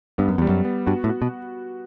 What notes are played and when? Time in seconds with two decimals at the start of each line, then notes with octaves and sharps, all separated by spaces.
0.18 G2 B3
0.28 F#2
0.38 E2 G3
0.49 F#2
0.65 B3
0.86 G2 F#4
1.04 A2
1.09 F#4
1.22 B2